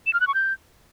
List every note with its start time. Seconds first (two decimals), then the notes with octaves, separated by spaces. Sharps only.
0.06 E7
0.13 F6
0.20 F#6
0.27 C#6
0.34 G6